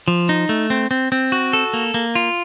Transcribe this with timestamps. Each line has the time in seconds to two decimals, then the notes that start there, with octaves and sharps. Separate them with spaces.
0.08 F3
0.29 D#4
0.49 A3
0.70 C4
0.91 C4
1.12 C4
1.32 F#4
1.53 A4
1.73 A#3
1.94 A#3
2.15 F4